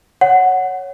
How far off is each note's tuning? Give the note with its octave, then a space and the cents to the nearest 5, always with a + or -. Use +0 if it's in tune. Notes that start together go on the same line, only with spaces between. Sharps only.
C#5 +0 F#5 +0